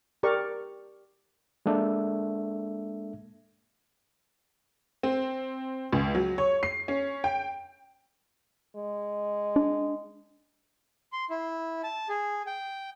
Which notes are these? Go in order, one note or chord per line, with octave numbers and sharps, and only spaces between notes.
G4 A#4 D5 C#6
G#3 A#3 D4 A4 E5
C4
C#2
F#3
C#5
C7
C#4
G5
G#3
D4
C6
E4
A5
G#4
G5